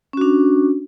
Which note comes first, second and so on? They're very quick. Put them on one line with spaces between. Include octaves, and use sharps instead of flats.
C#4 F#4 D4